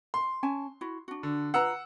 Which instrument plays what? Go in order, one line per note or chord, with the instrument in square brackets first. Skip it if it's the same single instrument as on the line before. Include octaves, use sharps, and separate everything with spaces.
[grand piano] C6
[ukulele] C#4 G#5 A5
E4 F#4
D4 F#4
[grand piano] D3
[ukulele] F4 B4 A#5 [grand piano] F#5 E6